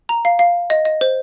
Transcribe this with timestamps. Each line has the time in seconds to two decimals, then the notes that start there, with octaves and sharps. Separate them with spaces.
0.09 A#5
0.25 F5
0.39 F5
0.70 D#5
0.85 D#5
1.01 C5